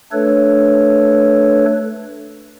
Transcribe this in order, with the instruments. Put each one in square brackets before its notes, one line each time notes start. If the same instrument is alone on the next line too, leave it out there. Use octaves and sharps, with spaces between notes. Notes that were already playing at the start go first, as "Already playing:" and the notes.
[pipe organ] A3 D4 A4 B4 C#5